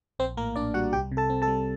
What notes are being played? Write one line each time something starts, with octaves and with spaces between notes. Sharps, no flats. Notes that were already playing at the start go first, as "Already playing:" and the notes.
A#1 C4 C5
A2 A#3 A#4
A#1 D4 D5
G3 F#4 F#5
C2 G4 G5
C3
A4 A5
C4
A4 A5
G3